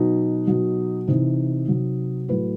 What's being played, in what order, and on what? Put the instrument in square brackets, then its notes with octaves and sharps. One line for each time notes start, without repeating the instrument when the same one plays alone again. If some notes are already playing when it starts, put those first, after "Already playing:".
Already playing: [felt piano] B2 F#3 D#4
B2 F#3
C3 E3 D#4
C3 F#3
A2 F#3 B4